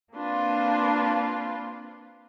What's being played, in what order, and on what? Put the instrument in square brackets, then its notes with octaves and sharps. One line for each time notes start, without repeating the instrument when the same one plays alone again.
[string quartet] A#3 C4 D4 F4 B4